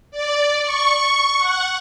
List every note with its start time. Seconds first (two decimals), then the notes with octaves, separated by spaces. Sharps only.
0.11 D5
0.62 C#6
1.38 F#5